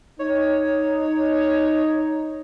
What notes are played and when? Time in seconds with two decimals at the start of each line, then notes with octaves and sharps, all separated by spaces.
0.19 D#4 C#5